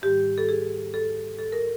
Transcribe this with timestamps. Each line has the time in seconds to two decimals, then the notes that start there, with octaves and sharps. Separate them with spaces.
0.02 G#2 D#3 G3 G4
0.38 A4
0.49 G#4
0.94 A4
1.39 A4
1.52 A#4